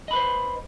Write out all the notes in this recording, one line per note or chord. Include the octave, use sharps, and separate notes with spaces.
B4 C5 D#5 B5